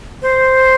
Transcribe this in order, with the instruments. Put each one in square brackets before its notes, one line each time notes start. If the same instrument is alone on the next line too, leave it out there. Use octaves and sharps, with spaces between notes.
[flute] C5